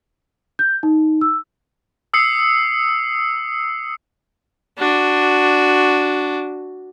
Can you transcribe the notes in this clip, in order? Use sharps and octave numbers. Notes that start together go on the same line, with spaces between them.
G6
D#4
E6
D#6 E6 C7 C#7
D4 F#4